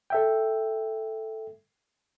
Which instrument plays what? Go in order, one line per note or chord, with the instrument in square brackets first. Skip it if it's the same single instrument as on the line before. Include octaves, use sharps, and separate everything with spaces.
[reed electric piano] A4 E5 G5